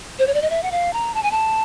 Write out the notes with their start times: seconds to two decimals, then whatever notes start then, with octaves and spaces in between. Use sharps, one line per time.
0.19 C5
0.27 C#5
0.34 D5
0.42 D#5
0.50 E5
0.63 F#5
0.72 F5
0.93 A#5
1.14 A5
1.23 G#5
1.31 A5